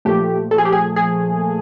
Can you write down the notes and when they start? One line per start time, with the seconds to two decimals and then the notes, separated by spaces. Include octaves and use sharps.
0.05 A#2 F3 A3 G4
0.51 A4
0.58 G#4
0.65 G4
0.72 G#4
0.96 G#4